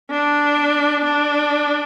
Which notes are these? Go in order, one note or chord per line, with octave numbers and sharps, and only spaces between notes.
D4
D4